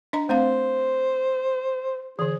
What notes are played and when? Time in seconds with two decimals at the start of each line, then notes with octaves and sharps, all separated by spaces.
0.13 D4 D#5 A#5
0.29 A3 C4 C5 F5
2.19 D3 E3 G#4